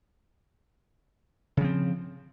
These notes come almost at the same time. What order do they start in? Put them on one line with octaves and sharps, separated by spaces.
C#3 F3 C4